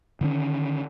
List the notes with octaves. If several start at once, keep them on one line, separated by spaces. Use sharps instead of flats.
D3 D#3 A3 C#4